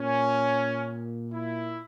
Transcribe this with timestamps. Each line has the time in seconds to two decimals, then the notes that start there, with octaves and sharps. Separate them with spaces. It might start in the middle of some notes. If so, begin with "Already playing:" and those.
Already playing: A#2 C#4
1.32 E4